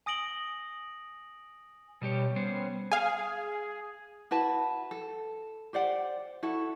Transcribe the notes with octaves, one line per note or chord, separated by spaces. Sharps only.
G#5 D#6 A#6 D7 F#7 G7
B2 G3 G4 C#5
G3 B3 C#4 C5
G#4 F5 G#5
E4 F#4 B4 A5
A4
G4 C5 D5 F#5
E4 F#4 A4